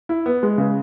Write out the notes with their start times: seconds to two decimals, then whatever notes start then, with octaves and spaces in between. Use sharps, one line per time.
0.09 E4
0.26 B3
0.43 G#3
0.58 C#3